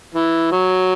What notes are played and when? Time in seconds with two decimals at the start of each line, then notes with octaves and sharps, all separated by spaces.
0.14 E3
0.52 F#3